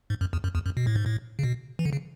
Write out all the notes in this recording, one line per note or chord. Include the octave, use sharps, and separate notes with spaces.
G#2
F#2
E2
F#2
E2
F#2
B2
A2
G#2
A2
C#3
B2
E3
D3
C#3